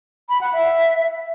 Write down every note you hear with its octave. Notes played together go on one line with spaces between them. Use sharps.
B5
F#5
E5